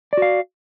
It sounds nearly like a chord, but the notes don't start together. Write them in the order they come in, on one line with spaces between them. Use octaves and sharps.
D5 F#4 F5